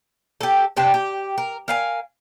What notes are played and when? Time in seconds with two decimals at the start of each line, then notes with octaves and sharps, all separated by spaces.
0.41 G4 A4
0.77 C3 D4 G5 A5
0.94 G4
1.38 A#4
1.68 A#4 F5 G#5